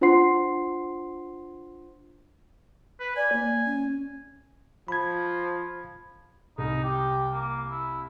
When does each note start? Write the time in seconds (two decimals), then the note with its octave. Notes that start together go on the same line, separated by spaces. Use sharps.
0.01 D4 F4 C5 F#5 C6 C7
3.00 B4
3.16 D5 G#5
3.32 A#3
3.66 C#4
4.88 F3 B5 G#6
6.58 C2 D#4
6.84 G4
7.32 A#3
7.71 E4